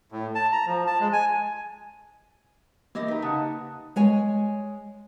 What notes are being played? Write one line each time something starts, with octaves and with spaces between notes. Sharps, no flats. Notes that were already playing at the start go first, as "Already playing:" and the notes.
A2
A5
A#5
F3
A5
G#3
G#5
E3 A#3 G4 D#5
D#4 G4 B4
C#3 F#5 A5 D#6
G#3 C#5 G#5